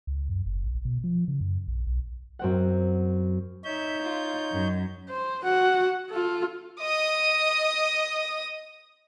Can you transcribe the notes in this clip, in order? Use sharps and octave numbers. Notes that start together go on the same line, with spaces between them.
C#2
F#2
F#1
A#1
B2
F3
C#3
F#2
A#1
B1
F#2 C4 F#5
D#4 C#5 E5 G6
F4
F#2
C5
F#4 F#5
F4 A4
D#5 D#6